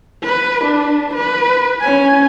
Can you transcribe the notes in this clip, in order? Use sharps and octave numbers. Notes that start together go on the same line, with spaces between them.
B4
D4
B4
C#4 G#5